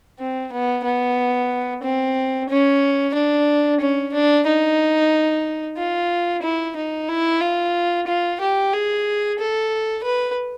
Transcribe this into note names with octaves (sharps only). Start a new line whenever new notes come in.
C4
B3
B3
C4
C#4
D4
C#4
D4
D#4
F4
E4
D#4
E4
F4
F4
G4
G#4
A4
B4